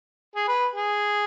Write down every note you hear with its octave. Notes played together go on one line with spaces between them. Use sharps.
G#4
B4
G#4